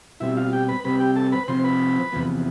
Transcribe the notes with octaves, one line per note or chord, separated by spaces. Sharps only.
B2 G3 C4 E4 E5
F4 F5
G4 G5
B4 B5
C3 G3 C4 B4 B5
G4 G5
A4 A5
B4 B5
C3 F3 C4 C5 C6
B4 B5
E2 C3 F3 B3